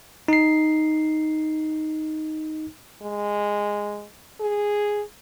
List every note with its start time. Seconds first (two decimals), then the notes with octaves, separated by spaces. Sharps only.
0.28 D#4 C7
3.02 G#3
4.40 G#4